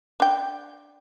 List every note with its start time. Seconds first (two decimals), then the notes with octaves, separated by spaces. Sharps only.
0.20 D4 G5